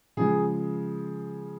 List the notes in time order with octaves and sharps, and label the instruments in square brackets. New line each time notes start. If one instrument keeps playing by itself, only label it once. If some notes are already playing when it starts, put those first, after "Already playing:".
[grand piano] C#3 F3 G#3 G#4